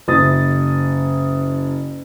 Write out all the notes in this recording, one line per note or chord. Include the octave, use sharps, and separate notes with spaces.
F#1 D#6 A6